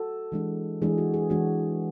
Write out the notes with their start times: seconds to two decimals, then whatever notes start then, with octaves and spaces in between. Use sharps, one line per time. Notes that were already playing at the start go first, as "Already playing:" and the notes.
Already playing: F#4 A4
0.32 E3 G#3 D4
0.82 E3 G#3 D4 G#4
0.98 F#4
1.14 G#4
1.30 E3 G#3 D4 F#4